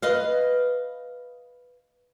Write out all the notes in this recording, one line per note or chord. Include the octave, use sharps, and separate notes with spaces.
B4 D#5 F5